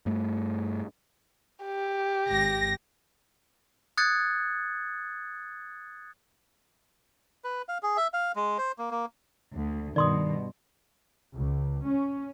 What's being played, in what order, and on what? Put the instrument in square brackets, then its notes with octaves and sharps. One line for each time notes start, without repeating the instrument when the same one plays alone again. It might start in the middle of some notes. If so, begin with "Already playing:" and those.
[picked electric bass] G2 A3
[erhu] G4
[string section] G#1 A#6
[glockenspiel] D#6 F#6 G#6 A6 C#7
[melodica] B4
F5
G#4
E5
F5
G#3
C5
A#3
A#3
[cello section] D2
[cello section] G2 B2 [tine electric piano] D#3 [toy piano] D5 C6 D#6
[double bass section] C#2
C#4